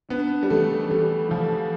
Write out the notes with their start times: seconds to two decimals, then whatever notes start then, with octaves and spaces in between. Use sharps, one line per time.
0.10 B3 D4
0.43 G3
0.50 E3 A3
0.91 E3 G3
1.31 E3 F3